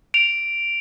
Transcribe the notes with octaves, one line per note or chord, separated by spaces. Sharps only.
D7 F7